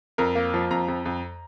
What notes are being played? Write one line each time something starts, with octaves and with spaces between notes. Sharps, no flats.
F2 A#4
A#3
F3
F2 A#5
F2
F2